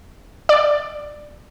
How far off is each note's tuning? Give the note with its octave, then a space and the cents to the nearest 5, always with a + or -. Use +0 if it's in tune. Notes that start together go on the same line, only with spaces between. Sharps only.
D5 +15